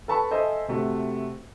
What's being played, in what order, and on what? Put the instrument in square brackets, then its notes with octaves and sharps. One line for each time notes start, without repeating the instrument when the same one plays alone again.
[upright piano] A4 B4 A5 B5 C#6
A4 C5 D#5 E5 G#5
C3 A3 F#4